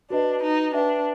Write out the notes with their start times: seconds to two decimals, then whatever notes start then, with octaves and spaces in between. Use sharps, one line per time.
0.10 D4 F#4 B4 D#5
0.42 D#4
0.74 D4 B4 E5 G5